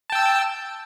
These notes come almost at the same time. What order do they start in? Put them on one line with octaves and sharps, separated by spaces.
A5 G5 E6